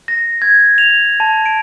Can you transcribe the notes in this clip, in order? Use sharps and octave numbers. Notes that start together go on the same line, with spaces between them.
A#6
G#6
F7
A5
D7